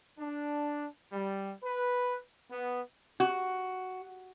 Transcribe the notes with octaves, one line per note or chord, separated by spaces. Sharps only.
D4
G3
B4
B3
F#4